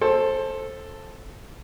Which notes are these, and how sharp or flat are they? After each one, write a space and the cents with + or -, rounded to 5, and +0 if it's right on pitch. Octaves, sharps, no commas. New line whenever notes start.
A4 +0 C5 +20